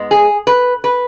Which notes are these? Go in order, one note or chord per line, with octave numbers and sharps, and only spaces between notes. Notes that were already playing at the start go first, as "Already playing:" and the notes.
Already playing: G#2 G#3 B3
G#4
B4
B4